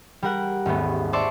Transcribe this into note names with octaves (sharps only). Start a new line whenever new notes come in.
G3 A#4 F#5
D#1 G#1 A3 B3
C5 D5 E5 A5 C6 C#6